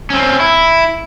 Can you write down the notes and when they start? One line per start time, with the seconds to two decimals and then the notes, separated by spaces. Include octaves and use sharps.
0.10 C4 C#4
0.40 E4